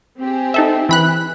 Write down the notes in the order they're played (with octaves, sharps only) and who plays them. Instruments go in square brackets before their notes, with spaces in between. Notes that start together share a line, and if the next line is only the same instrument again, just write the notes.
[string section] C4 G4 G#4
[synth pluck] D#4 A4 E5
E3 B5 F#6